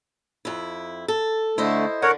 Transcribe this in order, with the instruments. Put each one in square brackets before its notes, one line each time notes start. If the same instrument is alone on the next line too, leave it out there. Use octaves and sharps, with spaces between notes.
[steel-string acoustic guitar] F2 E4
A4
[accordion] D3 A3 [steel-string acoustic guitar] E4 C5 D#5
[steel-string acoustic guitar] D3 [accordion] A#4 C#5 F#5